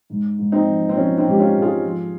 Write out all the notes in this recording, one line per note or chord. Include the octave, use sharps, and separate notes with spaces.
G#2
G#2
C4 D#4
F3
C4
F3 C#4
C4 D#4
G#2 G4
C#4 F4
G#2
F4 G#4
F3